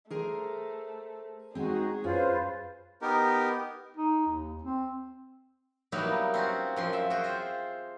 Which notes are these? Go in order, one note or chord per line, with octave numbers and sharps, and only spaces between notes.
A3 G#4 A#4 C5
G#3 C4 D#4 F#4 G#4
F#2 C#4 F4 B4 C5
B3 D#4 G4 A#4
D#4
D#2
C4
F#3 G3 A#3 B3 D#4 E4
C4 C#4 F4 F#4
F#2 F3 C6
E5
F#4 G#4 G5
F4 C5 E5